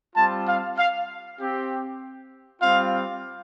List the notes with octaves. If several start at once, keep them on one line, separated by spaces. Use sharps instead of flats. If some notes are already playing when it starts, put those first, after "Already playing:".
G3 C4 F4 A5
F5
F5
C4 G4
G3 C4 F4 F5